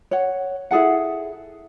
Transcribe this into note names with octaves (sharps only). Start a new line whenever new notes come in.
C#5 F#5
E4 G#4 A4 F#5